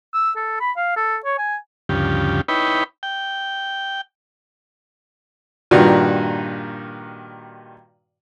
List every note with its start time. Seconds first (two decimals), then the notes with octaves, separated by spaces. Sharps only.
0.14 E6
0.36 A4
0.61 B5
0.77 F5
0.97 A4
1.25 C#5
1.38 G#5
1.89 D2 G2 C#3 F3 G4
2.48 D#4 E4 B4 C#5 G5 B5
3.03 G5
5.71 G2 A#2 D#3 F#4